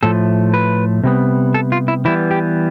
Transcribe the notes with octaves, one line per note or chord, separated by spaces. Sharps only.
A2 F3 A3 A4
B4
C3 G3 B3
A4
F4
E4
E3 G3 B3 E4
G4